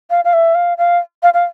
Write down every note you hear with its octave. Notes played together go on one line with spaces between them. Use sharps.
F5
F5
E5
F5
F5
F5
F5